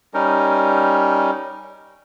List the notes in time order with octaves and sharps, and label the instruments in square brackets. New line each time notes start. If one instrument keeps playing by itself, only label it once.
[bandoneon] G3 C#4 D#4 A#4